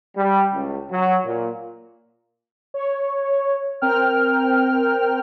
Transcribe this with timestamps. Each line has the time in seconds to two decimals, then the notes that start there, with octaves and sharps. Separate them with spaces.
0.16 G3
0.54 C#2
0.90 F#3
1.25 A#2
2.74 C#5
3.82 C4 A#4 G5 F6